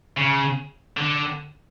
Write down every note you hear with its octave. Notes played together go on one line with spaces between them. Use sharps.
C#3
D3